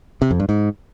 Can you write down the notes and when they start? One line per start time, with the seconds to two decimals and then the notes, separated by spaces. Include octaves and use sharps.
0.22 C3
0.31 F2
0.40 G2
0.49 G#2